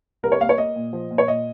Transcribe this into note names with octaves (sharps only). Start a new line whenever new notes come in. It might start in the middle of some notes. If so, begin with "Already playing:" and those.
C2 A#4
C#5
A#3 F5
C#5
A#3 D#5
A#2
F3
A#2
C#5
A#2 D#5